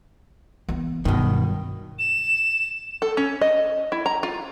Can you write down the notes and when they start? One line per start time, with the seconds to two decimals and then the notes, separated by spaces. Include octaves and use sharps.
0.68 E3 B3
1.05 G2 B2 D#3 F#3
1.99 E7
3.02 A4
3.17 C#4
3.41 D#5
3.92 E4
4.06 A#5
4.23 F4